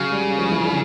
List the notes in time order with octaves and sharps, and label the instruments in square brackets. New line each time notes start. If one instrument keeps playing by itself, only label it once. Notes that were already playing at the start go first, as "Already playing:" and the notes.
Already playing: [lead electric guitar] C#3 [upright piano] F#3
[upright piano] G3
F3
E3
D3